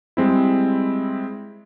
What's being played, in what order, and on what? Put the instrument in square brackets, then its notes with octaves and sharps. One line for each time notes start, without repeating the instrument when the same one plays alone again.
[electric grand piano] G3 G#3 C4 E4